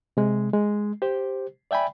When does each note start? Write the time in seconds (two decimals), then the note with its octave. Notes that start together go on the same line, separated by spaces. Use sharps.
0.17 C3 G#3
0.53 G#3
1.02 G4 C5
1.71 D5 E5 G5 G#5 B5